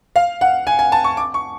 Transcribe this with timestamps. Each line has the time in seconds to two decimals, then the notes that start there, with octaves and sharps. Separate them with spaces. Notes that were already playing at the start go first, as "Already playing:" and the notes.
0.16 F5
0.41 F#5
0.67 G#5
0.79 G#5
0.92 A5
1.04 C#6
1.17 D6
1.34 C#6